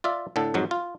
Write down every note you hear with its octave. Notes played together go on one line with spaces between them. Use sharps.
F4 D5 E5
A2 D3 A4
F2 G#2 F#3
F4